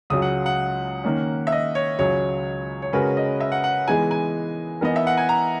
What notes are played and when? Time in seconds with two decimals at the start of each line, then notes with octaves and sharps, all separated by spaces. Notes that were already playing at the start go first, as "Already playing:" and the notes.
0.10 C#2 C#3 F#3 D#6
0.22 F#5
0.46 F#5
1.04 D#3 A#3 C#4
1.47 E5
1.52 D#5
1.75 C#5
1.99 C#2 C#3 F#3 C#5
2.82 C#5
2.93 C#3 G#3 C#4 F#4 A#4 B4
3.17 D#5
3.40 E5
3.52 F#5
3.64 F#5
3.88 E3 G#3 B3 D#4 G#4 G#5
4.11 G#5
4.81 E3 B3 D#4 A#4 D#5
4.96 E5
5.07 F#5
5.17 G#5
5.29 A#5